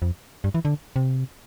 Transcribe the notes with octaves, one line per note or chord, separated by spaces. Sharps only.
F2
G2
E3
D3
C3